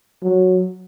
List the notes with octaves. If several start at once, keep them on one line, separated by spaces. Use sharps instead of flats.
F#3